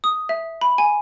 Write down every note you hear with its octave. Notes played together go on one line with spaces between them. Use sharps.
D#6
E5
B5
G#5